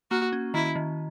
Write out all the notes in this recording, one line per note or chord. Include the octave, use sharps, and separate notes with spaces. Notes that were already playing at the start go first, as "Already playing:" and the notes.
A#3 F#4
C#4
D#3 E4
D#3